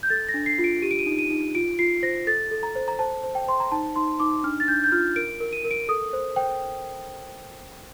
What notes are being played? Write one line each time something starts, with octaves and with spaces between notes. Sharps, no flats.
G6
A4 A6
A#6
D4
C7
F4
D7
G4 D#7
D7
D#7
D#4
D#7
D#4
F4 D7
F4 C7
C5 A#6
A4 A6
A4
A#5
C5
A#5
C5 A5
C5
G5
C5 C6
A#5
D#4 A5
D#4 C6
D#4 D6
D4 F6
A6
D4 G6
G6
F4 F6
A#4 D7
A#4
D#7
A#4
D7
A4 D#6
C5
C5 G5